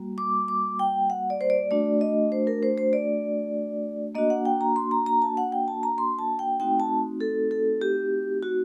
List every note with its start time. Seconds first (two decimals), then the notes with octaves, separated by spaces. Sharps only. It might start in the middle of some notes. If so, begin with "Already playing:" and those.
Already playing: G3 A#3 F#4
0.18 D6
0.48 D6
0.79 G5
1.10 F#5
1.30 D5
1.41 C5
1.50 D5
1.71 A3 D4 F#4 D5
2.01 D#5
2.32 C5
2.47 A#4
2.63 C5
2.78 C5
2.93 D5
4.15 A#3 D4 F#4 D#5
4.30 F#5
4.45 G5
4.61 A#5
4.76 C6
4.91 A#5
5.06 A#5
5.22 A5
5.37 F#5
5.52 G5
5.68 A5
5.83 A#5
5.98 C6
6.19 A5
6.39 G5
6.59 A3 C4 D#4 F#4 G5
6.80 A5
7.21 A4
7.51 A4
7.81 G4
8.43 F#4